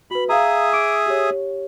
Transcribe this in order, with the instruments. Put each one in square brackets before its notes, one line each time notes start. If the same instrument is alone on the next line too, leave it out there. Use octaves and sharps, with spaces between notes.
[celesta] F#4 B4 [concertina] B5
[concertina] G#4 E5 D#6 [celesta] F5 A#5
[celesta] D6 D7
G4 C#5